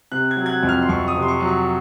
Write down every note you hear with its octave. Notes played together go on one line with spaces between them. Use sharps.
C3 F#6
G#6
F#3
G#6
F#6
F2
F6
C6
F2 C#6
D#6
C3
C6
C#6
F#3
C#6